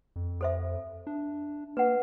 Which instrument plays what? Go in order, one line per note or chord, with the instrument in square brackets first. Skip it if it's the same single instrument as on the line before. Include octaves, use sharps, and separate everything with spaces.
[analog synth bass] F2
[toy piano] A4 C5 E5
[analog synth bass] D4
[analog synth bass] A#3 [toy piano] B4 F#5